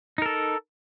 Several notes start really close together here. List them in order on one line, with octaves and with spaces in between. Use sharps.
D#4 A#4 A4